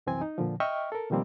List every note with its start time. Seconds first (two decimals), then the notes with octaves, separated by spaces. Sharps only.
0.07 C2 F#2 E3 C4 G#5
0.21 D#4
0.38 A#2 D3 F3
0.60 D#5 E5 G5 C#6 F6
0.92 A4 A#4
1.10 B2 D#3 F3 G3 A#3 C4